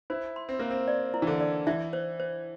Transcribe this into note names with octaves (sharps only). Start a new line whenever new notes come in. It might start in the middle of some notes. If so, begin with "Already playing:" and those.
E4 C5
C6
C4
A#3 C5
C4
D5
E4
E3
D3
D5
E3 E5
C5
C5